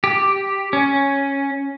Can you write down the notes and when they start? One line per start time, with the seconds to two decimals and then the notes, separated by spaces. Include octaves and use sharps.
0.04 G4
0.73 C#4